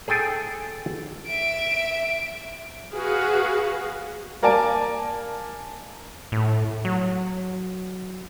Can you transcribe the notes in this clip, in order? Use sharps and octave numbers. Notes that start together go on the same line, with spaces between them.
G#4 A4 G5 G#5
E5 D7
F#4 G#4 B4 F5
A#3 A#4 D5 G#5 A5 D7
A2
F#3